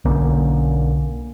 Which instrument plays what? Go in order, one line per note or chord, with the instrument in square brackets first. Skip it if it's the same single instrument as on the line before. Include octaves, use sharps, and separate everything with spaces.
[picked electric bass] B1 D3 A#3 C#4